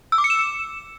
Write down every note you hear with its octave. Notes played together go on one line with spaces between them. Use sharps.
E6
D6
C#7
E7